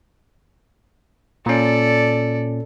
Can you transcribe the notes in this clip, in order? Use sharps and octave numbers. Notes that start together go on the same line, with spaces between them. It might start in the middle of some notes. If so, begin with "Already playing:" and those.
A#2 C#4 A4 D5